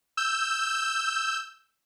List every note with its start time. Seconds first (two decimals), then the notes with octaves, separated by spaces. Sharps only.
0.17 E6 G6